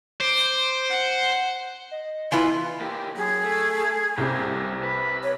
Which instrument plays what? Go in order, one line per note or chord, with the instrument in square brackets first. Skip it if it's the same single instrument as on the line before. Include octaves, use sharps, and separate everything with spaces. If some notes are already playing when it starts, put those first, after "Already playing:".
[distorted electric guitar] C5 [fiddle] D6
[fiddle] F#5
[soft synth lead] D#5
[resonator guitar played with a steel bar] E3 F4 B4 [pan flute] E4 [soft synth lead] C6
[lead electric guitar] A#3 G4
[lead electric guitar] F#2 [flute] G#4
[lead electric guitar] A3
[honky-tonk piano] C2 C3 [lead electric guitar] G3 A#3
[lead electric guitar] B4
[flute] C#5